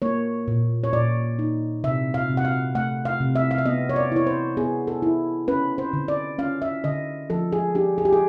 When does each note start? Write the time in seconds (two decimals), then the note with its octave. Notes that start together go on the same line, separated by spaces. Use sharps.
0.02 A#3 C#5
0.48 A#2
0.84 C#5
0.93 A#2 D5
1.39 D#4
1.84 C3 E5
2.14 F5
2.29 C3
2.37 F#5
2.45 F5
2.75 A3 F#5
3.05 F5
3.21 C3
3.35 E5
3.51 F5
3.58 E5
3.66 B3 D#5
3.90 C#5
3.96 D5
4.12 E4 C#5
4.27 C5
4.57 B3 G#4
4.88 A4
5.02 E4
5.48 C#4 B4
5.78 C5
5.93 D3
6.08 D5
6.39 C#4 F5
6.62 E5
6.84 D3 D#5
7.30 F3 A4
7.52 G#4
7.75 D4 G4
7.98 G#4
8.05 G4
8.13 G#4